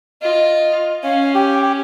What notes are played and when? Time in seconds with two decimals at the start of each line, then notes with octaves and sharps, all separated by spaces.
0.22 F4 D#5
1.03 C#4 F5
1.34 G4 G5